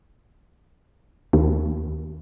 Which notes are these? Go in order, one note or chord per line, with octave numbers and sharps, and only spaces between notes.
D#2